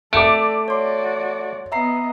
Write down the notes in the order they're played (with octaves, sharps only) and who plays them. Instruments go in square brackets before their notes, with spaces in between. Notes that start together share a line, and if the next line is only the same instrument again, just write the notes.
[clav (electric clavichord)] A3 [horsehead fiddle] A4 D5 [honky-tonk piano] D6 D7
[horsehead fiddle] F#4 D5 [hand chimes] C#5 C6
[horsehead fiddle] B3 D#5 [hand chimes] E5 A#5 C7